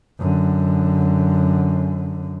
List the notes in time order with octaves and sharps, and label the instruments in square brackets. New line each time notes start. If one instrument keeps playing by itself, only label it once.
[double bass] F#2 D3